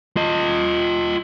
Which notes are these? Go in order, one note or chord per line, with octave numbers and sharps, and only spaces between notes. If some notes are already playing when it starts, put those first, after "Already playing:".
F4 D#5